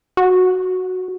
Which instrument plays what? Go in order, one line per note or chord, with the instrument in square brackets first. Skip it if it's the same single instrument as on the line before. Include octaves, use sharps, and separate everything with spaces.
[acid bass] F#4